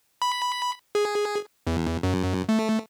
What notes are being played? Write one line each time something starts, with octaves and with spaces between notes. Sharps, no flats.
B5
G#4
E2
F#2
A3